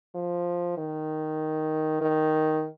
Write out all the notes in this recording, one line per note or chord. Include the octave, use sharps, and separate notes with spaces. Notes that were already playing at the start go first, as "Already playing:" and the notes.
F3
D#3
D#3